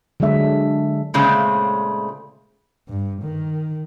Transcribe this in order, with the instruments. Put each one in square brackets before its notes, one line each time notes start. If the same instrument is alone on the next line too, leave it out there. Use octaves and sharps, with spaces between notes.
[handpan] D3 F#3 G#3 D4 E5
[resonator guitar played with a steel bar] A#2 C#3 G#3 A3 C4
[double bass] G2
D#3